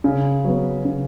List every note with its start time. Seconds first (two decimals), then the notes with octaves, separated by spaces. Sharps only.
0.04 C#3
0.44 F#3 B3
0.85 C#3